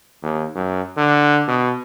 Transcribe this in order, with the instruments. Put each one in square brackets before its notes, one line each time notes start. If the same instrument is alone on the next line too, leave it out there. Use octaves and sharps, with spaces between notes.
[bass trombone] D#2
F#2
D3
B2